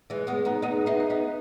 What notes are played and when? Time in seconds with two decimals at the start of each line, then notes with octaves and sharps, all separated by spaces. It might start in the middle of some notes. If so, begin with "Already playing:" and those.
0.10 E3 G#3
0.27 G#3 B3
0.45 B3 D#4
0.62 B3 D#4 G#4
0.86 B3 D#4 E5
1.00 E5
1.10 B3 D#4 D#5